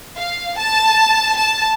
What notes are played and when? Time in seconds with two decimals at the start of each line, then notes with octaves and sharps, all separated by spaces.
0.16 F5
0.57 A5
1.36 A5